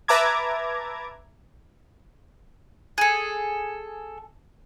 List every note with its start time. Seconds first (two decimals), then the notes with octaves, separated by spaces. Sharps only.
0.08 B4 E5 A5 A#5 D6 G#6
2.98 G#4 A4